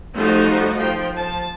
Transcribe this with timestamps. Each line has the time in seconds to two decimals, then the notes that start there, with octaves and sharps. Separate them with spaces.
0.15 F3 G3 A3 D#4 F#4
0.77 F3 G5
1.15 F3 A5